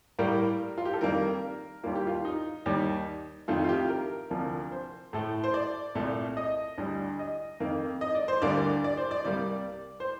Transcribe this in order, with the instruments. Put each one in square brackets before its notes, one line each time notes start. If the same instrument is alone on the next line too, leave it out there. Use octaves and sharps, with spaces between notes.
[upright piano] A2 G3 A#3 A#4
F4
G4
A4
F2 D#3 G3 A#3 A#4
D#2 D#3 G3 A#3 F4
G4
F4
D#4
D#2 D#3 G3
F2 D#3 A3 F4
F4
G4
A#4
D2 C3 F3 A#3
C5
A2 A3
C5
D5
C2 A#2 A3
D#5
D2 D3 G3
D#5
F2 D#3 A#3
D#5
D5
C5
D2 D3 G3 A#3 D5
D5
C5
D5
C2 C3 G3 A#3 D5
C5